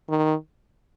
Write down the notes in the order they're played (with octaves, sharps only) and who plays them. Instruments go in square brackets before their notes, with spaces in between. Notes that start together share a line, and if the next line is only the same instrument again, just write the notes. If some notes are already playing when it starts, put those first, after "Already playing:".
[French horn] D#3